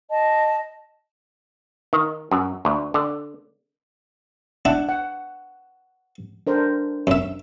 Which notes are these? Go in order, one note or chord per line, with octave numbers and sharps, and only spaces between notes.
D#5 A5
D#3
F#2
D2
D3
D4 E4 F#5
F#5
D4 A#4 C5
F#2 E5